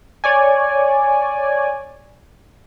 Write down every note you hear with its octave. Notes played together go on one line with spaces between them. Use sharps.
C#5 D5 G#5